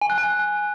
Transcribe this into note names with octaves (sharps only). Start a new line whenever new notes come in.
G#5
F#6
G#5